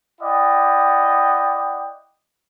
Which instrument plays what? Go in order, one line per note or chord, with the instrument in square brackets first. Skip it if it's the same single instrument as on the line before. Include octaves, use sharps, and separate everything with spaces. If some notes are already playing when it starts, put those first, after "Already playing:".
[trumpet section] E4 D5 D#5 F#5 G5